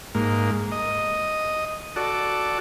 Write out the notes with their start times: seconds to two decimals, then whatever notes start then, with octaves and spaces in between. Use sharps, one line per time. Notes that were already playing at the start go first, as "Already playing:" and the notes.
0.14 G#2 A#3
0.72 D#5
1.96 F#4 A4 D5